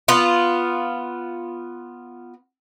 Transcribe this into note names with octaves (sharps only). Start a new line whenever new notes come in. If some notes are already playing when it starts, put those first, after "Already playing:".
B3 F4